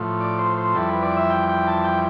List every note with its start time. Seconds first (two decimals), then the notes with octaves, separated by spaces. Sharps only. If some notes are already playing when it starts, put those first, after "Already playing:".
Already playing: A2 F3
0.21 D5
0.38 C5
0.58 C5
0.75 F2 E3 G3 A4
0.89 B4
1.03 D5
1.17 E5
1.30 G5
1.49 G5
1.67 A5
1.84 G5